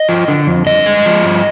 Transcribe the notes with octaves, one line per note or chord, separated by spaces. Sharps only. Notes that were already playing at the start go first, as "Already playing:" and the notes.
Already playing: D#5
F3
D3
F2
G2 D#5
G#3
F3
G2